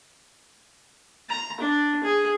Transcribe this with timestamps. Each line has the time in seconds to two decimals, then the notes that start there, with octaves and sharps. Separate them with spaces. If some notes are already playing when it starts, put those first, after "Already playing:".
1.29 A#5
1.61 D4
2.03 G#4